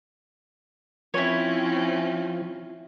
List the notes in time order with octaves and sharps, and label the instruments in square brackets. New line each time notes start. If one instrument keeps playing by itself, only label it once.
[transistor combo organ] F3 [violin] C4 C#4 [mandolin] E4 C#5